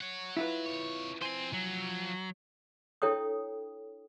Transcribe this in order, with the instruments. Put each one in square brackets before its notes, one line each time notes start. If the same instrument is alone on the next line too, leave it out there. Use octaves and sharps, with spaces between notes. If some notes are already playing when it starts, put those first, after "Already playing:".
[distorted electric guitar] C#5 F#5
[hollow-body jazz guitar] E4 F4 B4
[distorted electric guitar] F2 C#5
[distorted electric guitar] F3 G#5 [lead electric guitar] C4 C5
[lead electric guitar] F#3
[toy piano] D4 E4 A4 C#5 G5 D#6